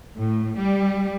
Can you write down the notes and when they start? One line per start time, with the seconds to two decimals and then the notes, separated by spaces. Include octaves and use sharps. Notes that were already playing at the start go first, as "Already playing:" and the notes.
0.17 A2
0.56 G3